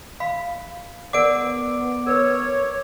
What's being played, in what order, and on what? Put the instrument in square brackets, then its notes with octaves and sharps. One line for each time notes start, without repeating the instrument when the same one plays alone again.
[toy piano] F5 B5
[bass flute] B3 [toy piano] A#4 D5 F#5 [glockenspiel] D6 D7
[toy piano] A#4 B4 [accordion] C#5